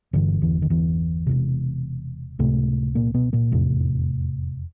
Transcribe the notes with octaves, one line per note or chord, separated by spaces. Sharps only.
G1 E2 G2 D3 E3
E2 E3
D#3
E2 E3
E1 E2 C3
C#2 A2 C3 A3
A#2 A#3
B2 B3
A#2 A#3
F1 E2 A2 C3 A3